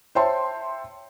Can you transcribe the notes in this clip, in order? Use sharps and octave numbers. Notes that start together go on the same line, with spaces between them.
C5 C#5 E5 G5 A5 C6